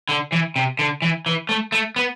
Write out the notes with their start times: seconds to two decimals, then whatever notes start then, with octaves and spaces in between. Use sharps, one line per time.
0.09 D3
0.32 E3
0.56 C3
0.79 D3
1.02 E3
1.26 E3
1.49 A3
1.72 A3
1.96 B3